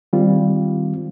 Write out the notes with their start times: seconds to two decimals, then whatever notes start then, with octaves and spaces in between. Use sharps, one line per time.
0.13 D#3 G3 C4 F4